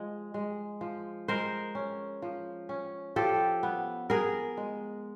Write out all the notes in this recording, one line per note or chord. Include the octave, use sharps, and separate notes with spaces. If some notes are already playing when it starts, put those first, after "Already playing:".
Already playing: F3 G#3
G#3
F3
G#3 A#4 C5
C#4
F3
C#4
F3 G4 A4
B3
B3 G#4 A#4
G#3